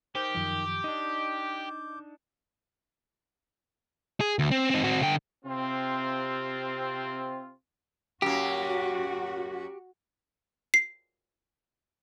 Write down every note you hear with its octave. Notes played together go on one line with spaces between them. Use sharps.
D#4 G4 A#4 C5 G5 D6 G6
F#2 D#3 F3
D4 D#4 D#5
G#4
D2
C4
C4 D#4
C4 F#4
D3 G5
C3 C4 F4
F#2 A#3 F#4 G4
C7